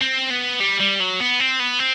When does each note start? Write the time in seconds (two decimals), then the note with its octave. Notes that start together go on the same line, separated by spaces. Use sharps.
0.01 C4
0.31 B3
0.60 G3
0.80 G3
1.00 F#3
1.20 B3
1.40 C4
1.59 B3
1.79 C4